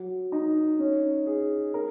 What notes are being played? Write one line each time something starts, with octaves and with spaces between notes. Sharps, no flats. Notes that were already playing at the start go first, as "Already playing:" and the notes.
Already playing: F#3
D#4
C#4
G#4
A#4